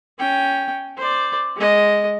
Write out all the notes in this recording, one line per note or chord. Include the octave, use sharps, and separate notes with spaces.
C#4 G5
C5 D5
G#3 D#5